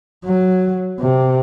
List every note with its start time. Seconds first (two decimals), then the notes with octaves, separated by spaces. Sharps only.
0.25 F#3
1.00 C3